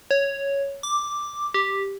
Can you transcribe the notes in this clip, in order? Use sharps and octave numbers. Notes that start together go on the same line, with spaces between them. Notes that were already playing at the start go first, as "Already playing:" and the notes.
C#5
D6
G4